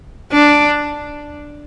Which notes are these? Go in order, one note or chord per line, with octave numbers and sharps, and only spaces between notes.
D4